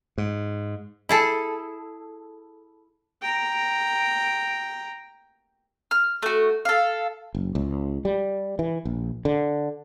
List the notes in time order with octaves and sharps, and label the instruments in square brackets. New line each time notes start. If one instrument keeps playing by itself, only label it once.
[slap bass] G#2
[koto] E4 G#4 A4
[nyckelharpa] G5 A#5
[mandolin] F6
A3 F#4
A4 F5
[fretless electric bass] F#1
C#2
G3
E3
A#1
D3